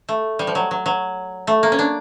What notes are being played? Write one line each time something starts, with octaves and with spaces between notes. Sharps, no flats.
A3
G3
F3
F#3
F#3
F#3
A3
A#3
C#4
D4